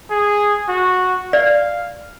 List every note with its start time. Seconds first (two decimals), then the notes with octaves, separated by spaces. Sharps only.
0.10 G#4
0.68 F#4
1.33 D5 F5